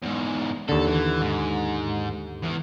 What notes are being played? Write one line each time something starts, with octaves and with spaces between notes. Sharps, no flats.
E2 G#2
D#2 D3 A4
E3
G#2
E2 E3